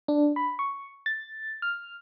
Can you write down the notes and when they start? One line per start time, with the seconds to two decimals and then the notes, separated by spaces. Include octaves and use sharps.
0.08 D4
0.36 B5
0.59 C#6
1.06 A6
1.62 F6